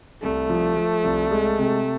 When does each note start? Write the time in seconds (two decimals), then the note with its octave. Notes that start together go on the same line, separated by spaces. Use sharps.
0.22 C2 A3
0.50 F3
0.77 F3
1.04 C2
1.31 G#3
1.59 C3